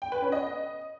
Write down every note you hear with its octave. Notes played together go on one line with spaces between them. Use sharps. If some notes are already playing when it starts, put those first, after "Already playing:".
G5
B4
C#4
D#5